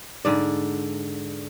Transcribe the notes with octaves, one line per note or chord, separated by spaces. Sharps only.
G#2 D3 D5